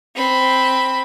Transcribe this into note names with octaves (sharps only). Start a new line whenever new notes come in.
C4 B5